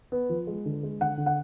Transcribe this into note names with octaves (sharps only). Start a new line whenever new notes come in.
B3
F3
G#3
D3
G#3
D3 F#5
D3
F#5